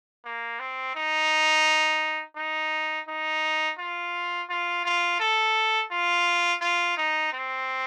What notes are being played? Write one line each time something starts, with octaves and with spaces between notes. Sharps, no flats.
A#3
C4
D#4
D#4
D#4
F4
F4
F4
A4
F4
F4
D#4
C4